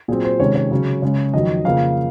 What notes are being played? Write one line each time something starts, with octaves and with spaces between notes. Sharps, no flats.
A#2 F#3 C4 G#4
C5
C3 D#3 G#3 C#4 C#5
C#5
C#3 F#3 C#4
C#3 G#3 C#4
F2 D#3 F#3 D#5
F2 C#3 F3 A#3 F5